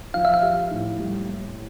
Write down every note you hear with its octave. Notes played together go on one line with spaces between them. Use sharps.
F3 F5
E5
F5
G4
A2
G3
A#3